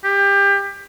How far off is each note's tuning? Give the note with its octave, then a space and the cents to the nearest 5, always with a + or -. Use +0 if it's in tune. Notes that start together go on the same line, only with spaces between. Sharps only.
G4 +25